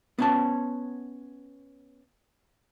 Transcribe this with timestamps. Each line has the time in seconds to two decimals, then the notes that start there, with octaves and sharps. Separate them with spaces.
0.18 B3 C#4 A5